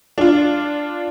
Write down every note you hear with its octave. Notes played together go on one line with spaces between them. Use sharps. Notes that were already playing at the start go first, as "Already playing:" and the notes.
D4 F4